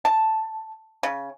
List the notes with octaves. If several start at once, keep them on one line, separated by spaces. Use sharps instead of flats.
A5
C#3